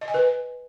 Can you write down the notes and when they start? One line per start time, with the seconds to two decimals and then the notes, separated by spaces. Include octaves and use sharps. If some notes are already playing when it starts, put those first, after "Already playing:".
0.01 D#5
0.08 G#5
0.14 B4